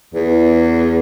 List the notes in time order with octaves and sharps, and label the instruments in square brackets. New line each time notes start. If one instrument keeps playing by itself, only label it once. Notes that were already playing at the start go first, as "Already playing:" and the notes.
[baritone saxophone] E2